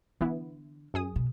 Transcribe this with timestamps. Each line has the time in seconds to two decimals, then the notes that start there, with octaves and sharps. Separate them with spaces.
0.21 D3 E3 B3 E4
0.94 F#2 G#4 D#6
1.16 B2